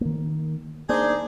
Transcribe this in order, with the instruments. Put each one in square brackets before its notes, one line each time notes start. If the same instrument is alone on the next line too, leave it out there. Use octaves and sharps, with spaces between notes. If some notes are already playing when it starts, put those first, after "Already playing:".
[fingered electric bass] D#3 A#3
[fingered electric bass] A#3 [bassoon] D4 [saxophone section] D#4 G#4 C5